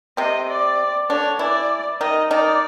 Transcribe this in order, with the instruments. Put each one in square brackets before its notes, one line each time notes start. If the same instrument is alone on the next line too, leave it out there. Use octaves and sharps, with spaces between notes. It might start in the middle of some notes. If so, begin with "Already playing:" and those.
[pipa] C3 C4 [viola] D#5
[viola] D5
[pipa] D3 D4 [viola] C#5
[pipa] E3 E4 [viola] D5
[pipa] D#3 D#4 [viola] D#5
[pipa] D#3 D#4 [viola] D5